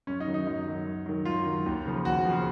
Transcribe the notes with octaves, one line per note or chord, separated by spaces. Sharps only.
F#2 C#4
D#4
D#3 F#3
D#4
F#2 D#4
D#3 F#3
F#2
D#3 F#3
F#2 F4
D#3 F#3
D#2
C#3 F3
D#2 F#4
C#3 F3